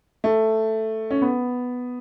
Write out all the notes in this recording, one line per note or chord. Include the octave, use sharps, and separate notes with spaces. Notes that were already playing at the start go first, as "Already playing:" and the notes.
A3
C#4
B3